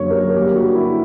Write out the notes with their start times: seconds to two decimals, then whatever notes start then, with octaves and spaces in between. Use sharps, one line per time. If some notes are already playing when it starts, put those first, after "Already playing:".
Already playing: F#2 D3 F#3 A#3 C#5
0.10 A#4
0.35 G2 D3 A#3 G4
0.55 F#4
0.75 E4